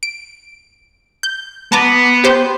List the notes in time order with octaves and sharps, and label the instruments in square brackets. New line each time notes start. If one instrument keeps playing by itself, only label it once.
[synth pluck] D7
G6
[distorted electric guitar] B3 [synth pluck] A5 A#5 D6
[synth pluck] G4 C5